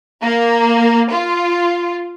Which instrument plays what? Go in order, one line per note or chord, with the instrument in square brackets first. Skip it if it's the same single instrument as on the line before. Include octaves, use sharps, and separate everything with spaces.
[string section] A#3
F4